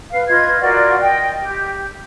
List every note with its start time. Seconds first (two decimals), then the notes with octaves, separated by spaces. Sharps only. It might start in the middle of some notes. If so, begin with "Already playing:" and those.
0.11 B4 F5
0.28 F4 B4 D#5 G#6
0.60 F4 F#4 A#4 D5
1.00 D#5 G5
1.41 G4